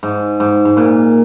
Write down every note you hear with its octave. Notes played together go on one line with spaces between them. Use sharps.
G#2
G#2
G#2
A#2